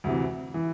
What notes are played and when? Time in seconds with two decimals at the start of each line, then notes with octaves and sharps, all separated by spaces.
0.04 D2 C3 E3
0.54 E3